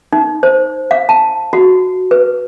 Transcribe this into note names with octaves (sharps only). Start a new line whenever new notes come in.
D#4
C5
F5
A5
F#4
B4